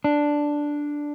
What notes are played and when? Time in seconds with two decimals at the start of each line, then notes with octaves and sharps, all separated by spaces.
0.04 D4